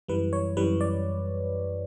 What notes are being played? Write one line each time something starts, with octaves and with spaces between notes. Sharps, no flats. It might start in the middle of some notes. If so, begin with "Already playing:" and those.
F#2 E3 G3 B4
C#5
F#2 E3 G3 B4
D5